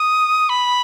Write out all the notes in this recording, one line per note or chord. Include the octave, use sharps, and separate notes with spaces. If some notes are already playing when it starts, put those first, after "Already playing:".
Already playing: D#6
B5